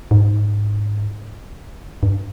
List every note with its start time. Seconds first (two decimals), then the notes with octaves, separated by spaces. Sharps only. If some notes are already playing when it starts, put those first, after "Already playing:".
0.11 G#2
2.03 G2